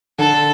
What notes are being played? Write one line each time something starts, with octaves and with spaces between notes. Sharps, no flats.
D3 A4